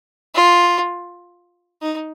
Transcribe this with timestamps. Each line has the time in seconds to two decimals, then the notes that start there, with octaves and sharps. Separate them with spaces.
0.34 F4
1.82 D#4